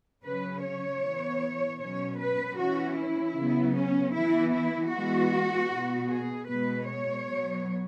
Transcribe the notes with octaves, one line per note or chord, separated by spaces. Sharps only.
C#3 F#3 C#4 B4
C#5
E3 B3
B2 F#3 C#4 C#5
B4
E3 C#4 F#4
E4
C#3 F#3 B3
C#4
E3 B3 E4
E4
E3 G#3 B3 F#4
B2 B3
G#4
B2 G#3 B3 B4
C#5
B2 F#3 B3